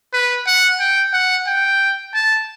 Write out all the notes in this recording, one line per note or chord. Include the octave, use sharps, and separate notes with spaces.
B4
F#5
G5
F#5
G5
A5